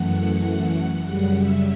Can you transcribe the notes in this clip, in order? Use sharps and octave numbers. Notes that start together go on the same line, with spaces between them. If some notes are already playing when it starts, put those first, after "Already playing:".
Already playing: F#2 E3 A3 F#5
F#2 C#3 G3 F#5
E5